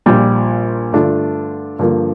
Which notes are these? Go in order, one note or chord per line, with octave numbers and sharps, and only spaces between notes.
A#1 A#2 G3
G2 D3 A3 D4 F4
G2 D3 F3 A#3